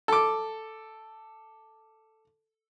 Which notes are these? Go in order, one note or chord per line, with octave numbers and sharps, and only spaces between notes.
A4 D6